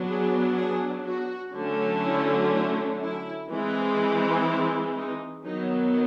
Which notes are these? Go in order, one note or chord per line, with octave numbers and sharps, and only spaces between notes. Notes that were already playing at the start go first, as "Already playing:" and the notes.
Already playing: F#3 B3 D4
G#4
G#4
F#4
D3 F#3 A3 C#4
E4
E4
E4
E3 G#3 C4
E4
D#4
D#3 F#3 B3 D#4